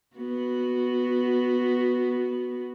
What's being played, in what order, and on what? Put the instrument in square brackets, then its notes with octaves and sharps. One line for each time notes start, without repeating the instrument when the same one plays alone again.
[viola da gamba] B3 F#4